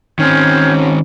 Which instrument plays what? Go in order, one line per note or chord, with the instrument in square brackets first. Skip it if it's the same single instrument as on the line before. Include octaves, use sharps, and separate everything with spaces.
[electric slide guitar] D#3 C4 [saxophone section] C#4 [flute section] F6 G6 G#6